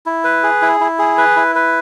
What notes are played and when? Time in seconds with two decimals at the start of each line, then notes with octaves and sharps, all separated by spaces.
0.06 E4
0.24 B4
0.43 G#4
0.62 E4
0.80 E4
0.99 G#4
1.18 B4
1.36 E4
1.55 B4